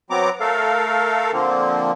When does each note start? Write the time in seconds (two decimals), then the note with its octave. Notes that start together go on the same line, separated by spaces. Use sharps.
0.10 F#3 B3 C4 A#5 D6
0.40 A3 A4 A#4 F5
1.33 D3 F3 A#3 C4